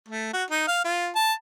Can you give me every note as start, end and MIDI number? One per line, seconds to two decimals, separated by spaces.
0.08 0.30 57
0.33 0.44 66
0.50 0.66 63
0.67 0.80 77
0.84 1.10 65
1.15 1.33 81